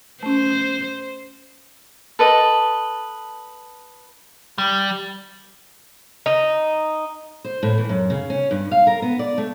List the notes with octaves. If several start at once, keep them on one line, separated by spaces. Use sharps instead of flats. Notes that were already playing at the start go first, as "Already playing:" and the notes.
A3 C#4 C5
A4 B4 D#5
G3
D#4
C5
A2
E3
F#2
C#3
C#4
G2
F5
A#4
B3
D5
A3